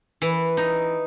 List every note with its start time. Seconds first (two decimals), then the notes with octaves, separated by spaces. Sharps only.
0.22 E3
0.57 D#4